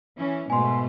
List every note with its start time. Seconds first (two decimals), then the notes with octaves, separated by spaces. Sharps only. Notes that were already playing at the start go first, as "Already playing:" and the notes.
0.17 E3 C#4
0.50 G#2 B2 A3 G#5 C6